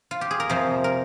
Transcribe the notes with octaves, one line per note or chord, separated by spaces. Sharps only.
F4
G4
G#4
A#4
F2 C3 F3 C5
A#4